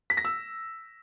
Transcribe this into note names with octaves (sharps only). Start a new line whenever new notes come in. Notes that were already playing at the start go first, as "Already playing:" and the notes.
B6
A#6
E6